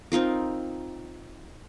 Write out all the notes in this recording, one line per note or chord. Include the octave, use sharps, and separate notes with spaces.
C4 D#4 F4 A#4